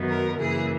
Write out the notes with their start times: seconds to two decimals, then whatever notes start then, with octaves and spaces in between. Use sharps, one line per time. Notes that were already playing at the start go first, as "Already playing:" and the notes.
Already playing: F#2 D#3 F#3 B3
0.09 A#4
0.39 F#2 C#3 E3 A#3 G#4